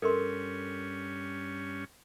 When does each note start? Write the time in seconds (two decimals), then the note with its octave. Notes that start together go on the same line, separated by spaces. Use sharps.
0.02 G2 C#4 A4 A#4 C6